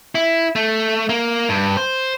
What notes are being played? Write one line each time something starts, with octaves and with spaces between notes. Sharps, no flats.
E4
A3
A#3
G2
C5